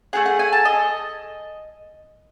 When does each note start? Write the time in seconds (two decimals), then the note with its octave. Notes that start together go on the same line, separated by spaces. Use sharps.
0.13 A3 E4 G#4 F#5
0.26 F#5
0.39 G#5
0.52 A5
0.65 D#5